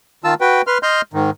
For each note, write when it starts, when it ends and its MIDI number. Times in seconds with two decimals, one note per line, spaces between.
0.24 0.34 51
0.24 0.34 65
0.24 0.34 81
0.24 0.34 88
0.41 0.62 66
0.41 0.62 71
0.41 0.62 79
0.67 0.78 71
0.67 0.78 84
0.67 0.78 89
0.83 1.01 75
0.83 1.01 84
0.83 1.01 89
0.83 1.01 91
1.13 1.30 44
1.13 1.30 51